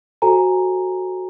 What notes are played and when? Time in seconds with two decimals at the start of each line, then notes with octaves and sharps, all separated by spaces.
0.22 F#4 A4 C5 G#5 A#5